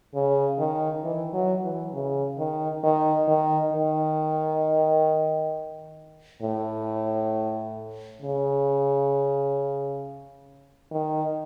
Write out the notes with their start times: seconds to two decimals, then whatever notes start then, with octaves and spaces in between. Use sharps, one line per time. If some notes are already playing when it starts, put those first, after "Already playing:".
0.14 C#3
0.59 D#3
1.04 E3
1.33 F#3
1.64 E3
1.93 C#3
2.38 D#3
2.83 D#3
3.28 D#3
3.73 D#3
6.42 A2
8.22 C#3
10.91 D#3